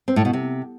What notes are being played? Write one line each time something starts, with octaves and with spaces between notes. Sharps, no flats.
C4
A2
B2
C3